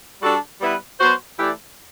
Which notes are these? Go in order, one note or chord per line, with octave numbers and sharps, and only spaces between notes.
G3 D4 F#4 A4
G3 B3 E4 B4
F#3 B3 F#4 C5
E3 A3 E4 G4 D5